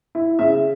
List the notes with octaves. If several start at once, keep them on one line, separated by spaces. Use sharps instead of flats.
E4
C#3 E5